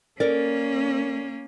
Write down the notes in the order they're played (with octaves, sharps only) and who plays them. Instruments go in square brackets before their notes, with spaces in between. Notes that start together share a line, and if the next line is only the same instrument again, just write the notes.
[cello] A#3 C#4 [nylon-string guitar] A4 A#4 D5